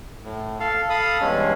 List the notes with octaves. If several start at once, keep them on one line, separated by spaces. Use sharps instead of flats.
A2
A4 F5
A4 F5 B5 D#6
E2 G2 G#3 C#4